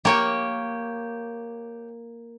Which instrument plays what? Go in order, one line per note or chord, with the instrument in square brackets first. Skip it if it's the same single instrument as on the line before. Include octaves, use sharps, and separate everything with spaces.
[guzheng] A#3 [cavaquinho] G4 C#5 G5